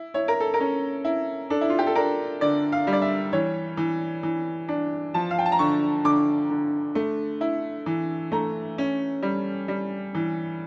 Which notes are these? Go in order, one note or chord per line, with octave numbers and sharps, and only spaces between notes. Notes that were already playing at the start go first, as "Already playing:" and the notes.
Already playing: E4
E4 C#5
A#4
A4
A#4
C#4
E4
D4 A4
E4
F4
G4
A4
D4 A#4
D3 D5
F5
G3
D5
E5
E3 C#5
E3
E3
D4
F3 A5
F5
G5
A5
A#5
D3 C#6
D3 D6
D3
A3
E4
E3
A3 A#5
C#4
G3
G3
E3